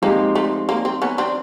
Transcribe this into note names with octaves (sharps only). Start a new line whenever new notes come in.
F3 G#3 A#3 C4 D#4 G4
A3
A#3
C4
B3 C#4
C4 D4